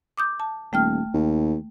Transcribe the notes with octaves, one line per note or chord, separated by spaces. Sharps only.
D6 D#6 G6
A5
D#1 A3 G5 F6
D#2